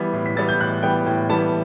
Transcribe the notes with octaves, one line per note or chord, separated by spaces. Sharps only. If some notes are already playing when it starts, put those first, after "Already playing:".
Already playing: E3 G3 B3
A2
B6
E3 G3 B3 A6
G6
A2 F#6
E3 G3 B3 G5
A2 G5
E3 G3 B3 A5